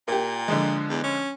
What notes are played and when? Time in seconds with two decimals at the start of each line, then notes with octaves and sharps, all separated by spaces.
0.08 A#2 A#3 G4
0.48 D3 F3 G#3
0.89 E2
1.03 C#4